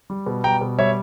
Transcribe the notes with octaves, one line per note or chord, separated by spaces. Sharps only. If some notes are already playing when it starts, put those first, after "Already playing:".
G3
B2
G3 G5 A#5
B2
G3 C#5 E5